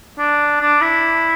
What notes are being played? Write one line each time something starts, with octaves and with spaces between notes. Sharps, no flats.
D4
D4
E4